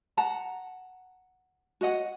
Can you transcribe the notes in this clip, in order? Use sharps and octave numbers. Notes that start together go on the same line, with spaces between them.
F#5 A5 A#5
F#4 C#5 D#5 F#5